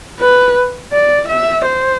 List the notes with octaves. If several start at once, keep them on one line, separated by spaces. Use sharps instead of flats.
B4
D5
E5
C5